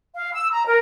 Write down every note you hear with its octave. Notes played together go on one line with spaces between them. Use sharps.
F5
E6
A#5
A#4